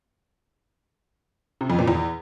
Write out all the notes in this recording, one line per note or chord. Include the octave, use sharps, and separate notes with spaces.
C3
F2
A#2
E2